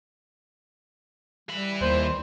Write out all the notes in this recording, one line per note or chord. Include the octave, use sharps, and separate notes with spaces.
E3 G3 B5
D#2 C5